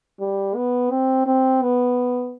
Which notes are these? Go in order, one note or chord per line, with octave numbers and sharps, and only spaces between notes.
G3
B3
C4
C4
B3